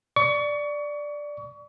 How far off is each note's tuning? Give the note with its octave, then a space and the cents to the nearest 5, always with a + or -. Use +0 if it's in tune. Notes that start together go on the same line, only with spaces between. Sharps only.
D5 +0 C#6 +30